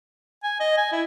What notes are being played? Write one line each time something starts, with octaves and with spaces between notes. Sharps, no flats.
G#5
D#5
G#5
E4